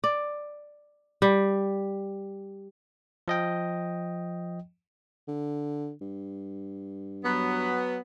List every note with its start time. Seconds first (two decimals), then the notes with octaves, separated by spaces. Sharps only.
0.04 D5
1.22 G3
3.28 F3 D#5 G5
5.28 D3
6.01 G2
7.24 F#3 B3